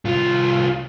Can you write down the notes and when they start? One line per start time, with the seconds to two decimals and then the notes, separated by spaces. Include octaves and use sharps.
0.05 C2 F4